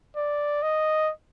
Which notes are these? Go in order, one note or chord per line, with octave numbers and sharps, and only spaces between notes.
D5
D#5